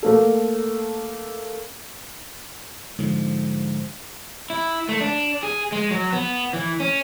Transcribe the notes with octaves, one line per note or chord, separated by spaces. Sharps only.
A3 A#3 A4
G#2 D3 F3
E4
A3
D4
G#4
G#3
F#3
B3
E3
C#4